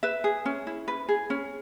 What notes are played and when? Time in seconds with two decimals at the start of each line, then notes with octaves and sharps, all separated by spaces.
0.03 B4 E5
0.24 G#4
0.45 C#4
0.67 E4
0.88 B4
1.09 G#4
1.30 C#4